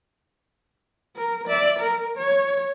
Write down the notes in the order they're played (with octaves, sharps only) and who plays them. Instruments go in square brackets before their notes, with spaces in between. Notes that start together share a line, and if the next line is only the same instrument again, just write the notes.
[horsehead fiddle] A#4
D5 E5
A#4
C#5